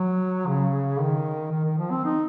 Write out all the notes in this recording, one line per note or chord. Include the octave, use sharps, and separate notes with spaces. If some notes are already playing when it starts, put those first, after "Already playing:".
Already playing: F#3
C#3
D#3
D#3
D#3
F3
C4
D#4